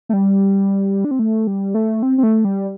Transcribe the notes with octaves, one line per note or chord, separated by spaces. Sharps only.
A3
G3
D4
C4
A3
G3
A3
C4
C4
A3
G3